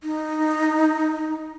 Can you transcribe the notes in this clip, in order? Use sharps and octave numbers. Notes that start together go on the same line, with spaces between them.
D#4